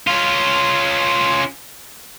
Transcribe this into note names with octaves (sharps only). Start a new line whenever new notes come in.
C#4 F4